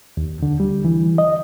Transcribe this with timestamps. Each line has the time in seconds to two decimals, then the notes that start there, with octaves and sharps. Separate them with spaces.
0.17 D#2
0.43 D3
0.60 G3
0.85 E3
1.18 D#5